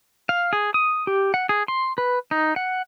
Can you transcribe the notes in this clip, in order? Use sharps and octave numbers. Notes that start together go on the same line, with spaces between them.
F5
G#4
D#6
G4
F#5
G#4
C6
B4
D#4
F#5